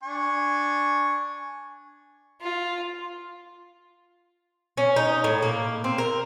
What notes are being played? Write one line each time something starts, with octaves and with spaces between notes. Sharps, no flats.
D4 G#5 C#6
F4
C#4
D#4
A2
A#3
C4
A#4